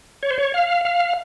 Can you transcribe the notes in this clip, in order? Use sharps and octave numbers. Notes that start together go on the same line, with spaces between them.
C#5
C5
C#5
F5
F5